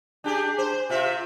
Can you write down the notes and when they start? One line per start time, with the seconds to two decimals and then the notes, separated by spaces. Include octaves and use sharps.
0.24 D4 G4 G#4
0.58 C5
0.90 C3 F4 E5